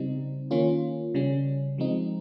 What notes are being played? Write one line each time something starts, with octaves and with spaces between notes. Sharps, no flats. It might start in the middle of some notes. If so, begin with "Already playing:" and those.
Already playing: C#3 G3 C4 D#4
D#3 A#3 C#4 F4
C#3 G3 C#4
F3 G#3 C4 D#4